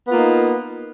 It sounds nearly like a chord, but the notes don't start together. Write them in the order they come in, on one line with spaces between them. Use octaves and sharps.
B3 F4 A#3 D#4